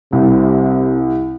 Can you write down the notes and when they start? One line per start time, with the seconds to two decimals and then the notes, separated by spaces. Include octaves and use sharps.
0.13 C2 C3